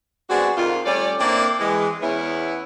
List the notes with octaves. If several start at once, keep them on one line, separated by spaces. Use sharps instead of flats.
G#3 B3 C4 D4 F#4
F2 D#3 F4
G3 A3 C#4 D5
A#3 C4 D4 E4 A#4 D5
E3 G#3
E2 B3 C#4 E4